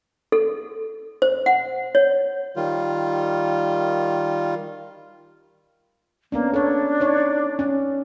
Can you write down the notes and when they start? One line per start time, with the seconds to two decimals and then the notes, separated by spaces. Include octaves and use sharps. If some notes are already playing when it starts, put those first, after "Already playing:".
0.32 A4
1.22 C5
1.46 F#5
1.95 C#5
2.56 D#3 G3 F4
6.32 A#3 B3 C#4 D4
6.54 D4 A4 C#5
7.00 D#4 C#5 D5
7.59 C#4